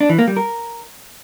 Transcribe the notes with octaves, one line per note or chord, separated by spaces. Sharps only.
D4
E3
A#3
G3
A#4